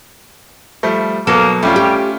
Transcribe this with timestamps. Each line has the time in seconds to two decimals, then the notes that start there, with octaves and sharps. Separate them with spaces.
0.83 F3 G3 A3
1.27 B2 F#3 A#3 A4
1.63 F2 G3 A3 C#4 F4
1.76 G4